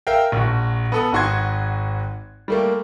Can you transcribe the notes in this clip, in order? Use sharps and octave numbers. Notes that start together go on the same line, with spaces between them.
A#4 E5 F5 G5
A#1 F#4
B3 A4 D#6
G#1 G#2 F#4 C6 C#6 G#6
G3 A3 A#3